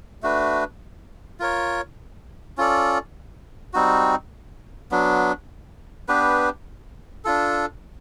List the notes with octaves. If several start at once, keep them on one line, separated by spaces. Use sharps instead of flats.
A3 D4 F#4 B4
F4 A#4 C#5
C#4 F4 A4 D5
G3 C4 D#4 F#4
F#3 B3 D4
B3 D4 G4 B4
D4 F4 A4